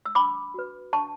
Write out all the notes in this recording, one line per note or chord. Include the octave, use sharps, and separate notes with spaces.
E6
D4 B5 D6
F#4 B4
D4 A5 C#6